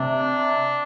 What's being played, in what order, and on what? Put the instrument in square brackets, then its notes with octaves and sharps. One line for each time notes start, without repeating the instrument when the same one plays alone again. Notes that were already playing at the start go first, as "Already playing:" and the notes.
Already playing: [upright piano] C3 [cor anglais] D4